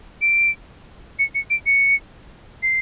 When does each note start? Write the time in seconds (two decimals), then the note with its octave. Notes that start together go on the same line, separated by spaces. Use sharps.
0.22 D7
1.19 C#7
1.35 C#7
1.50 D7
1.66 C#7
2.63 C7